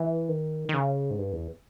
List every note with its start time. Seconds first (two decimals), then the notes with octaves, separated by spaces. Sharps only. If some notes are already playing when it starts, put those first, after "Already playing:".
Already playing: E3
0.29 D#3
0.69 D#3
0.74 C#3
1.11 G#2
1.18 G2
1.33 E2